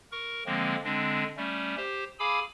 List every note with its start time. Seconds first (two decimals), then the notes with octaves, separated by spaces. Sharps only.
0.12 A#4 C#6
0.46 D3 F3 G#3 A#3 C4
0.84 D3 G#3 C4 D4
1.37 G3 A3 C#4
1.77 G4 C5
2.19 G#4 F5 G#5 B5 D6 E6